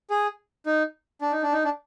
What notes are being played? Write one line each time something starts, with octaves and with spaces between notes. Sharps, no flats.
G#4
D#4
D4
D#4
D4
D#4
D4